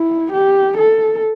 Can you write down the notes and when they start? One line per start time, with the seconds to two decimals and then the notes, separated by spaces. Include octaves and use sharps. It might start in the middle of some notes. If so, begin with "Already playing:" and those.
Already playing: E4
0.32 G4
0.78 A4